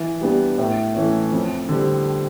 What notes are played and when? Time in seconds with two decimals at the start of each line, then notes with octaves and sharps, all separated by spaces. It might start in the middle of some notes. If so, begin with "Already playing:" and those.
Already playing: E3
0.21 G3 B3 D4 G4
0.58 A2
0.95 E3 A3 C#4
1.32 F2
1.69 D3 G3 C4